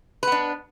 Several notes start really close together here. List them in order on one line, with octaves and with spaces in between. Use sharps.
B4 B3 D4